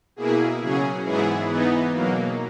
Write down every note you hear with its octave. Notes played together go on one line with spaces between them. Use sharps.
B2 A#3 E4 G#4
C#3 F#3 C#4 G#4
G#2 E3 B3 E4 G#4
E3 B3 D#4
B2 F#3 A#3